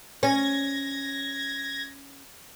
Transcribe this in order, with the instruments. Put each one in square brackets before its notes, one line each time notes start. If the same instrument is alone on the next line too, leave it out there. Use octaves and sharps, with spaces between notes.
[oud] C#4 [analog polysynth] G#6 A#6